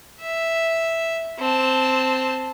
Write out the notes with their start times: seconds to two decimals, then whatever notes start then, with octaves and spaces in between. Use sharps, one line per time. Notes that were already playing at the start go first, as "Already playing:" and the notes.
0.21 E5
1.39 C4 A5